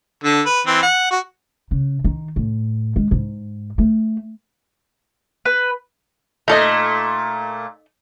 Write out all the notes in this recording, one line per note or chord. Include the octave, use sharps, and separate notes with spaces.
D3 A4
B4
E3 C4
F#5
F#4
C#3
D#3
A2
G#3
G#2
A3
B4
A#2 A3 D#4 A4 D#5